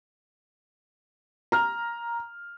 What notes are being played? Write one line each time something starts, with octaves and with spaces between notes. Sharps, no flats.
A#5 F6